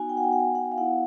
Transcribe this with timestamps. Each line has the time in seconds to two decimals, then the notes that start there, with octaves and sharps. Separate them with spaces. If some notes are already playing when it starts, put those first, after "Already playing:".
Already playing: B3 D#4 F#4 G#5
0.09 G5
0.17 F#5
0.23 G5
0.32 F#5
0.55 F#5
0.72 F5
0.78 B3 E4 F#5